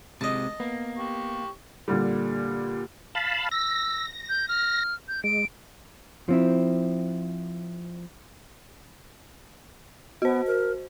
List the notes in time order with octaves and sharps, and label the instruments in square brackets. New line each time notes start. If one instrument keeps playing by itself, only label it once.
[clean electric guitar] C3 G#3 [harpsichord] D#5 A5
[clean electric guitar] A#3 [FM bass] B3
[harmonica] G4 C#6
[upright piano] A#2 D3 G3
[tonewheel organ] F5 A5 B5
[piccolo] E6 [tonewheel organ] A#6
[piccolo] G6
F6
G6
[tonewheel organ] G#3 [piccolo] D7
[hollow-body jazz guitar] F3 C4 E4
[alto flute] B3 [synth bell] F#4 C5
[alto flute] A#4